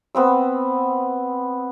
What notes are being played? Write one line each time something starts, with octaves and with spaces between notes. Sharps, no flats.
B3 C4 E6